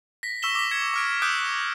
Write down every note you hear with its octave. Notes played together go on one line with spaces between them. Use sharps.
A#6 B6
C#6 E6 B6 E7 G7
D6 B6
G#6 C#7 E7
D6 F6 D7
D6 D#6 F#6 G6 A#6 D7